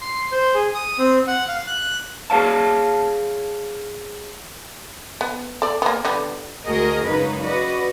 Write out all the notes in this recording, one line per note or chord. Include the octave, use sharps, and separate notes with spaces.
C6
C5
G#4
D#6
C4
F#5
F5
F#6
G#4 C#5 F5 A5
B3
A4 D5
A#3 B3
D3 G3 B3
D2 G#3 F#4 G#4 A#4 D#5
F#2 C#3 F#3 G#3 D#4 B4
F#4 B4 D5 D#5